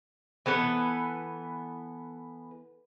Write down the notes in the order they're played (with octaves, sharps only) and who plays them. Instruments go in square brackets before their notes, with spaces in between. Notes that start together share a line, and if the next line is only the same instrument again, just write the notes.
[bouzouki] E3 B3 A4 B4